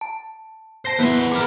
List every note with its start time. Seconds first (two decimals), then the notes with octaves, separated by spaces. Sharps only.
0.01 A5
0.85 C5 A5 A#6 C7
0.99 E2 B3 E4 B4 C6
1.32 G#4 A#4 B5 D6 F6